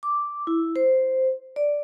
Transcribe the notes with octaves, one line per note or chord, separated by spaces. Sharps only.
D6
E4
C5
D5